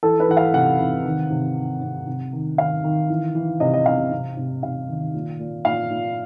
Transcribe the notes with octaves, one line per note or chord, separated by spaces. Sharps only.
E3 A4
B4
E3 F#5
F5
C3 F#5
C3
D#3
C3
D#3
C3
C3
D#3
D#3 F5
D#3
E3
E3
C3 D#5
D#5
C3 F5
C3
C3
C3 F5
D#3
A#2
A#2
A#2 F5
A#2